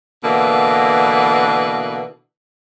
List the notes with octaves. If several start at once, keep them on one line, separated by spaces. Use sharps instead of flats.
B2 D3 E3 A#3